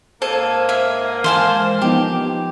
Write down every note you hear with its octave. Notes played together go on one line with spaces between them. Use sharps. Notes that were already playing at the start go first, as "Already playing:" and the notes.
G#2 A#3 A4 C5 G#6 D#7
E5 F5
E3 G#3 C5 F5 G#5 A5 E7
F3 B3 D#4 G4 D6